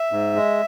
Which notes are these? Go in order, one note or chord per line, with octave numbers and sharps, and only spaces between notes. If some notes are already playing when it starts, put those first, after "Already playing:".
Already playing: E5
G#2
G#3